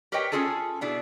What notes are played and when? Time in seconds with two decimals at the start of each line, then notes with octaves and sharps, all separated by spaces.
0.12 G4 A#4 B4 C#5 D#5 G5
0.32 C#4 D#4 F4 G#4 A4 A5
0.81 B2 D4 E4 G#4